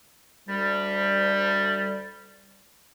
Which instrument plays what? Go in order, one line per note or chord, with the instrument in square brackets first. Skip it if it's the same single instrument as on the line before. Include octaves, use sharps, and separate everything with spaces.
[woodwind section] D2 G3